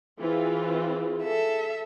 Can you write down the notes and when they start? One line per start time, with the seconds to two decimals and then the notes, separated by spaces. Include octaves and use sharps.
0.21 E3 C4 F4 G#4
1.23 A4 E5